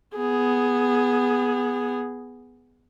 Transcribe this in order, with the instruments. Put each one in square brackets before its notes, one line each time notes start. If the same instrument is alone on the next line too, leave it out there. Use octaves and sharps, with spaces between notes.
[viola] B3 G#4